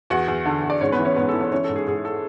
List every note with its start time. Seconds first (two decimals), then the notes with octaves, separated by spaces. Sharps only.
0.10 E2 F#4 F#5
0.28 E2
0.46 D3
0.64 E2
0.70 D5
0.81 G#2 C#4 C#5
0.92 B3 B4
0.99 E3
1.05 C#4 C#5
1.16 G#2 B3 B4
1.29 E3 A4
1.40 C#4 C#5
1.52 E3 C#4 C#5
1.64 A4
1.69 G#2
1.76 G#4
1.87 G#2 G#4
2.05 A4